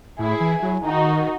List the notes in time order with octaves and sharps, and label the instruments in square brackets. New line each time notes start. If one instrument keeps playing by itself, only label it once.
[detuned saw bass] A2 [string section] E4 G#4
[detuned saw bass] E3
F#3
[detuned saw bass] D#3 [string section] D#4 F#4